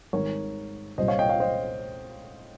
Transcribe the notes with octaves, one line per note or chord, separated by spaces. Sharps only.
G#1 G#2 D#3 G3 A#4 C#5
C2 A#2 G3 C5 D#5
C#5 F5
D#5 G5
C#5 F5
C5 D#5